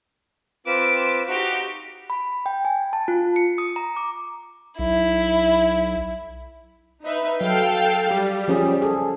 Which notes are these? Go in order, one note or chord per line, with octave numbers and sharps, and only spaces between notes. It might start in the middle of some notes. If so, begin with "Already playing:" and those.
C4 F4 B4 D6 E7
D#4 F#4 G4 F#6
B5
G5
G#5
A5
F4
C#7
D#6
A#5
D6
B1 E4
D#4 B4 E5
F#3 A4 F5 G5
G3 G4
F3 C#4 G#4
G#4 A4